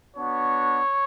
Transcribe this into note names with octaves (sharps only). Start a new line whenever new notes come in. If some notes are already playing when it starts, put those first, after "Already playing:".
B3 D4 F#4 C#5